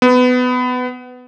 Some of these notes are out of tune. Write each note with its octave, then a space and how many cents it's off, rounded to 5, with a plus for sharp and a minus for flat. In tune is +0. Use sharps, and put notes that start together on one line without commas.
B3 +20